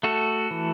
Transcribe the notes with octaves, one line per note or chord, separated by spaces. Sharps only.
A3 F#4 A4
E3